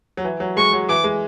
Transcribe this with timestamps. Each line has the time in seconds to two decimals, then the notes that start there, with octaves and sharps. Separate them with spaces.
0.17 F#3
0.24 E3
0.40 F#3
0.57 G#3 C#6
0.73 F#3
0.89 E3 D6
1.04 G#3